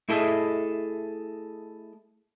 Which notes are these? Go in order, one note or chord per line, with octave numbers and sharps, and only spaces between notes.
A3 E4 G#4 A4 D#5 E5